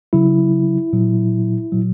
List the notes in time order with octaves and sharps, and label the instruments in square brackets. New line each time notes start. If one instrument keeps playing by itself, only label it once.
[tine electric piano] C#3 F#3 E4
A#2 F#3
A#2 F#3